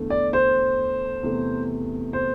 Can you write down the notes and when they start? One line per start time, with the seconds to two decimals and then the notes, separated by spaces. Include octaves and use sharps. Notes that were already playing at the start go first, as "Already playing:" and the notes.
Already playing: E2 D3 A3
0.10 D5
0.33 C5
1.23 E2 C3 A3
2.13 C5